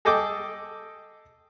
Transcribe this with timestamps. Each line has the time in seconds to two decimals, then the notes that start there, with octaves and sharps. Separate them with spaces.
0.05 G#4 A4 D#5 G5 D6